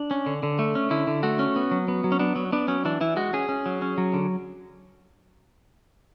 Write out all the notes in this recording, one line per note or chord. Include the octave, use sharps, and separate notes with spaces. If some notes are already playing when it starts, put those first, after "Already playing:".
Already playing: D4
C#4
D3
D3
A3
C#4
D3 E4
D3
A3 F#4
C#4
B3
F#3
B3
F#3
C#4
B3 D4
F#3
B3 D4
F#3 C#4
E3 D4
E3 E4
G#3 F#4
C#4 G#4
C#4
F#3
C#4
F#3
D3